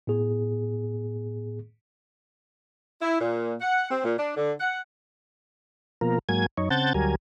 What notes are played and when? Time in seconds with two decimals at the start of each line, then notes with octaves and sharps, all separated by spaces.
0.07 A2 B3 G#4
3.02 E4
3.21 A#2
3.61 F#5
3.91 C4
4.05 A#2
4.18 D4
4.37 D3
4.61 F#5
6.01 B2 F3 A#3 A#4
6.29 G#2 F#3 A#3 G#5 G#6
6.58 F#2 D#4 C#5
6.70 C#3 C4 F#5 A5 G6 A6
6.94 D2 F#3 G3 A#4 G#5